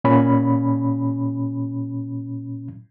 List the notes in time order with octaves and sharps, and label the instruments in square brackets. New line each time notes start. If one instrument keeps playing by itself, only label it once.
[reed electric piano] A#2 C#4 B5